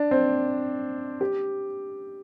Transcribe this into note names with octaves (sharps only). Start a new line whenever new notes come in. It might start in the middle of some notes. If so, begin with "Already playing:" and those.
Already playing: D4
C4
G4